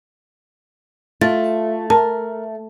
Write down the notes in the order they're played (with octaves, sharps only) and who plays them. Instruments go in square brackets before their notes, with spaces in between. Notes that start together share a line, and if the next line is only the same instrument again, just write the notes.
[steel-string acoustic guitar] A3 [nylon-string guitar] F4 [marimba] A6
[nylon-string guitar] A#4 [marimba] A5